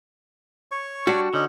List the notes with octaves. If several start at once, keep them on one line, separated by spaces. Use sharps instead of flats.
C#5 C#6
G3 D4 F#4
D3 C#4 D#4